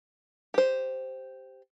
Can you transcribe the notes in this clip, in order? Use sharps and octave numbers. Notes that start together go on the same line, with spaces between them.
G4 C5